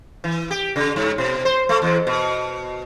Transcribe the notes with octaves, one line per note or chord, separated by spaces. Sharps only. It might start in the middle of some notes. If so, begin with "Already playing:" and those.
E3
G4
C#3
G#2
B2
C5
A3
E2
B2